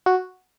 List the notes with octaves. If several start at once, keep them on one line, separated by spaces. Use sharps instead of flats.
F#4